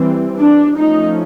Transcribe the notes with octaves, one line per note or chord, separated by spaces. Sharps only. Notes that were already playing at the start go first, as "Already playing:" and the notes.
Already playing: E3 G3 C4
D4
F3 A3 C#4 D#4